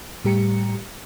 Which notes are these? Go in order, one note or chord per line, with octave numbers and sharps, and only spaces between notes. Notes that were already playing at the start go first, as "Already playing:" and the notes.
A2 G3 G4 A#5 C#7